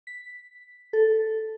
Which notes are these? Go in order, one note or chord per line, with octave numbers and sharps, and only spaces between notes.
B6
A4